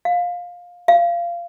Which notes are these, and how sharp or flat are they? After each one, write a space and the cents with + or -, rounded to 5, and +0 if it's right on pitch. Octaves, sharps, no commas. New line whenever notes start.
F5 +20
F5 -20